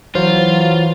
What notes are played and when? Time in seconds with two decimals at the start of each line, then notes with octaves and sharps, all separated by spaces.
0.15 E3 F#3 F4 C5 C#5